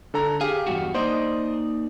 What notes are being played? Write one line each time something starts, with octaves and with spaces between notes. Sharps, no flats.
D3 A4 A#5
G4 G#4 F5
E2 G2 F#4
A#3 D#4 C5 D5 D#5